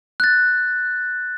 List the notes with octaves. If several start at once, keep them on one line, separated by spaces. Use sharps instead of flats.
F#6 A6